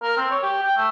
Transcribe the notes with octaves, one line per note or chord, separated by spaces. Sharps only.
A#4
C4
C#5
G4
G5
A3